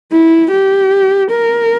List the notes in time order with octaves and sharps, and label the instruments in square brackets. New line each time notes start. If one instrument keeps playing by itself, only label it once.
[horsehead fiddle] E4
G4
A#4